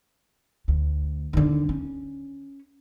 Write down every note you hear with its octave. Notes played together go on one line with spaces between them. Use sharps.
D2
D#2 D3
C#4